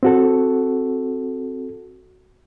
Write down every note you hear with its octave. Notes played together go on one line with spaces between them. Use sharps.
C4 F#4 A4